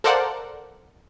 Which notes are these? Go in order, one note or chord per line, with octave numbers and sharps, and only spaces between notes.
A4 A#4 C5 D5 F5 F#5